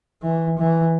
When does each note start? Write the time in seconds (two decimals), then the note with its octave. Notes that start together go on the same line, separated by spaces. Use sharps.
0.22 E3
0.58 E3